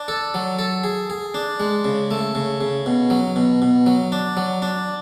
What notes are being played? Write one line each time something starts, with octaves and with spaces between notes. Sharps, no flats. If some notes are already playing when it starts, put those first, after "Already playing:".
Already playing: D4
A4
F#3
A4
G#4
G#4
D4
G#3
C#3
A3
C#3
C#3
B2
F#3
B2
B2
F#3
D4
F#3
D4